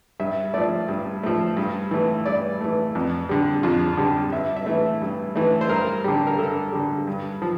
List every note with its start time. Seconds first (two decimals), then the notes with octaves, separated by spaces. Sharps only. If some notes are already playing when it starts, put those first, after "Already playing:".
0.20 G2 E5
0.54 F3 A3 D5
0.89 G2
1.23 F3 A3
1.57 G2
1.91 E3 A3
2.25 G2 D5
2.61 E3 A3
2.95 F2
3.29 D3 G3
3.63 F2 F4
3.97 D3 G3
4.32 G2 E5
4.57 E5
4.66 E3 A3
5.02 G2
5.35 E3 A3
5.61 C5
5.69 G2 A#4
6.04 D3 G3
6.27 A#4
6.39 G2 A4
6.72 D3 G3
7.07 G2
7.42 F3